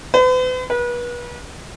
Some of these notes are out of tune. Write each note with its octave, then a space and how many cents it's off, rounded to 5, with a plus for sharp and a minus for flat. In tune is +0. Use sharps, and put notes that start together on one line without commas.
B4 +45
B4 -35